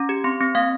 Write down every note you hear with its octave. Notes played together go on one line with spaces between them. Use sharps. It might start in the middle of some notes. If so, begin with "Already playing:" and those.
Already playing: C#4 A#5
G4
C4 C6
C4
A#3 F5